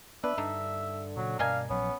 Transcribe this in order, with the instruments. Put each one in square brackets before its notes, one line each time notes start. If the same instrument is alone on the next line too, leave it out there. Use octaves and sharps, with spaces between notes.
[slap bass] B3 [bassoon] D4 [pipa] B4 [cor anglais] E5
[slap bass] G2 [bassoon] D3 [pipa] D4 D#4
[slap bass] A#2 C#3 [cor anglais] F#3
[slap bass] G2 B2 [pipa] A#3 D#5 G#5 [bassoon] D4 [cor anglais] F5
[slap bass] A#1 F#3 [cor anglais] B3 [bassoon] C#4